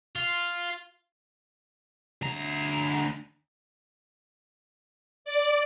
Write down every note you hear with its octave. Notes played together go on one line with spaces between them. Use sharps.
F4
D2 A#5
D5